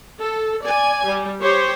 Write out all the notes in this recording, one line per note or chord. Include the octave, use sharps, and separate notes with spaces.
A4
D5 G#5
G3
G4 C5 C#5